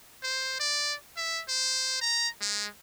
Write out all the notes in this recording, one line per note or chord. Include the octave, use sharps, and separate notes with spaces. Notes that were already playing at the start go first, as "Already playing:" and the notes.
C5
D5
E5
C5
A#5
G#3